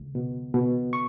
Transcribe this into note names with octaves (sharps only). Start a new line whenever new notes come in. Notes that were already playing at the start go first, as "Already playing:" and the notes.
Already playing: C#2
B2
B2
C#6